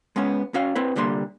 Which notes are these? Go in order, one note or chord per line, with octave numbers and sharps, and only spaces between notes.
G#3 B3 C#4
C#4 F#4 F5
C4 E4 B4
C2 D3 G3 A#3 C6